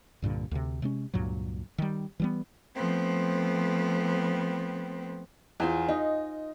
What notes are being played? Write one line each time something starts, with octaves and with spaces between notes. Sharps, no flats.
C2 G2 A#2 D3
D2 C3
C3 G#3 C#4
C#2 G2 A#2 F#3
D#3 G3
E3 G3 B3
F3 A3 B3 C4
E2 F4 C5 G#5
D#4 D#5